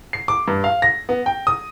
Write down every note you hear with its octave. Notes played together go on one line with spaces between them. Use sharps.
C7
D6
G2
F5
A#6
B3
G5
D#6